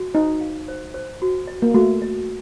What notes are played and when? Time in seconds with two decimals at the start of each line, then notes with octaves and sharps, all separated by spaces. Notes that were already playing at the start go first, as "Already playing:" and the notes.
Already playing: F#4
0.14 D#4 C5
0.41 F5
0.68 C5
0.94 C5
1.22 F#4
1.47 D#5
1.62 A#3
1.74 A3 F#4
2.02 D#5